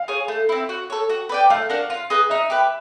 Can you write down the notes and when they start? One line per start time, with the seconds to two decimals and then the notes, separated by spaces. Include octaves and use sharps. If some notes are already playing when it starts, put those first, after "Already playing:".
Already playing: F5
0.08 G#4 C#5
0.28 A3
0.49 C4 E4
0.69 F#4
0.90 A4 C#5
1.09 F#4
1.29 B4 D5 G5
1.50 A3 F5
1.70 D4 F#4 A#4
1.90 F4
2.10 G#4 B4 D#5
2.30 D#4 E5
2.50 G4 B4